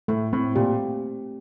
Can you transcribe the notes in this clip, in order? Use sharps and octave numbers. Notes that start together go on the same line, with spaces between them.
A2 A3
A2 C4
A#2 G4